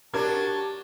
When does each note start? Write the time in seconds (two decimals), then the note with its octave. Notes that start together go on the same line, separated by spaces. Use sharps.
0.13 F#3 D4 G4 A#4 A5 G#6